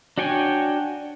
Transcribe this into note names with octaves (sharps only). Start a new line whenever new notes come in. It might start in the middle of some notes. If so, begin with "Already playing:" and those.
D4 F#4 C#5 G5 G#5